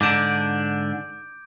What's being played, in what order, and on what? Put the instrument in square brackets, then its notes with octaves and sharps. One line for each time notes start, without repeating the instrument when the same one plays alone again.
[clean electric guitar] G#2 D3 D4 [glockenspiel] D6 G6 D7